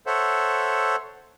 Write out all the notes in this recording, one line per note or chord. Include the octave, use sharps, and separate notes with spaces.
A4 C5 C#5 E5 F#5